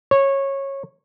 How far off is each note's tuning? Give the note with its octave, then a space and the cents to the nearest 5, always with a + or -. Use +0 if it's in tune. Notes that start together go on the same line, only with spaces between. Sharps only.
C#5 -15